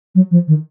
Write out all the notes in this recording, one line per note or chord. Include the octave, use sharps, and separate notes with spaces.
F#3
F3
D#3